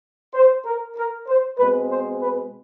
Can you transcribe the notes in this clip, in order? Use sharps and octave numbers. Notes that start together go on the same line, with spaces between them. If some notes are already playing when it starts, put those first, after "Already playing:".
C5
A#4
A#4
C5
B2 G#3 C4 B4
C5
B4